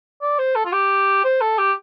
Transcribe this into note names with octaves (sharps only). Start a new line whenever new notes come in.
D5
C5
A4
F4
G4
C5
A4
G4